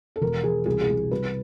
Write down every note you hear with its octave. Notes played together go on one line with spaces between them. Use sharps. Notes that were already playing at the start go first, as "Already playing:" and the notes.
A4
E1 A#4
E1 G#4
C2 G#4
G#4
C2
C2 B4